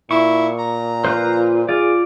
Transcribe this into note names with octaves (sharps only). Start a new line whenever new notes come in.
A#2 E4 C#6
A#5
F4 B4 C5
F4 G#4 D5